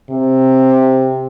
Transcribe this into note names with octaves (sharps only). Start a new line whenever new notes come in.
C3